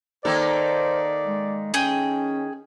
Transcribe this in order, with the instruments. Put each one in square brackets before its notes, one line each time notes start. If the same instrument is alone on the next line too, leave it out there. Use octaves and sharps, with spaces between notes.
[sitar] D#3 A#3 A4 [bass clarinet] C5 [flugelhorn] D5
[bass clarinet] G#3
[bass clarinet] C#4 [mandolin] G#4 G5